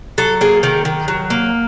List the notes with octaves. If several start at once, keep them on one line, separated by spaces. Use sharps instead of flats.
F#3 A4
A#3 G#4
D#3 A#4
D#3
F#3
A#3